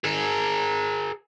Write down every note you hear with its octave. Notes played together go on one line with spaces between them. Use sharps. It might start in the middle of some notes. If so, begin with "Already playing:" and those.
G#4 A#4